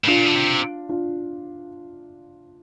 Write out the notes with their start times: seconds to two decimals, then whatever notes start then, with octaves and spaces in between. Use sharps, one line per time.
0.04 A2
0.07 A#2 D4 F4
0.27 D3
0.35 C3
0.89 D4 F4